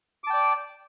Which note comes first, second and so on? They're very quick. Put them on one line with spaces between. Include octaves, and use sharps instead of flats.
D6 A5 G5 D5